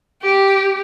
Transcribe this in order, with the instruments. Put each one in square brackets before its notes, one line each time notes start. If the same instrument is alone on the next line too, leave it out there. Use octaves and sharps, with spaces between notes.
[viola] G4